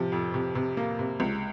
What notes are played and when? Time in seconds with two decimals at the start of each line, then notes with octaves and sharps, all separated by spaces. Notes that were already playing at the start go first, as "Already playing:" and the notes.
Already playing: C3 F3
0.12 F2
0.34 C3
0.55 C3
0.77 A#3
0.99 C3
1.20 C#2